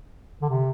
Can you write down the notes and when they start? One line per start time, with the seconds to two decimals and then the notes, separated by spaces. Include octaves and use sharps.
0.42 D3
0.49 C3